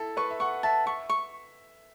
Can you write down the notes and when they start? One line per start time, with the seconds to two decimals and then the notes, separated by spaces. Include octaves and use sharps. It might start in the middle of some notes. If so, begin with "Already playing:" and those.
Already playing: E4 A4
0.17 B4 C#6
0.31 E5
0.40 F#5 C#6
0.63 E5 A5
0.86 E5 C#6
1.09 C#6